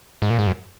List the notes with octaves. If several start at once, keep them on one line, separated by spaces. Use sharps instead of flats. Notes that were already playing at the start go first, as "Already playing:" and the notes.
G#2
A#2
G#2
F#2